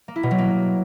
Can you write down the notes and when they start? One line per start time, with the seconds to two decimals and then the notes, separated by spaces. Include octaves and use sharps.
0.08 A#3
0.16 E4
0.23 B2
0.31 F#3
0.38 A#3